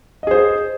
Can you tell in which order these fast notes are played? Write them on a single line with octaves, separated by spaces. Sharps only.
D#5 G#4 C5